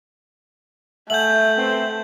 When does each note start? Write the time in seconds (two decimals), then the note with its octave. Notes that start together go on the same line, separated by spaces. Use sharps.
1.10 A3 E5 F#5 G#5 G6 F#7
1.58 B3 C4 C5